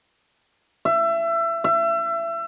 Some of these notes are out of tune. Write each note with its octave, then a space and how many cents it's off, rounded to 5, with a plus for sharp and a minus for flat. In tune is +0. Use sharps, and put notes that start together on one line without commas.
E5 +25
E5 +30